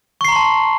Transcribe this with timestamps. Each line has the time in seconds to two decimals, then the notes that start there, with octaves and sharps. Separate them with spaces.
0.21 C#6
0.25 C7
0.28 A#5
0.32 C6
0.36 A5